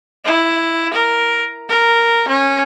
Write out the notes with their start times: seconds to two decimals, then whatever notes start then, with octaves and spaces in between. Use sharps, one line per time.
0.25 E4
0.93 A#4
1.69 A#4
2.28 C#4